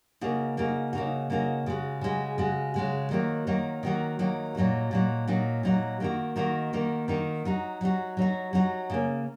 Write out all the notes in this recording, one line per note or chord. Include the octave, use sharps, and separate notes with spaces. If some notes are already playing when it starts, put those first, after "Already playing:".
C#3 A#3 D#4 F#4
C#3 A#3 D#4 F#4
C#3 A#3 D#4 F#4
C#3 A#3 D#4 F#4
C#3 G#3 F#4
C#3 G#3 F#4
C#3 G#3 F#4
C#3 G#3 F#4
D#3 F#3 A#3 D#4 F#4
D#3 F#3 A#3 D#4 F#4
D#3 F#3 A#3 D#4 F#4
D#3 F#3 A#3 D#4 F#4
A#2 F#3 D#4 F#4
A#2 F#3 D#4 F#4
A#2 F#3 D#4 F#4
A#2 F#3 D#4 F#4
D#3 A#3 D#4 F#4
D#3 A#3 D#4 F#4
D#3 A#3 D#4 F#4
D#3 A#3 D#4 F#4
F#3 D#4 F#4
F#3 D#4 F#4
F#3 D#4 F#4
F#3 D#4 F#4
C#3 A#3 C#4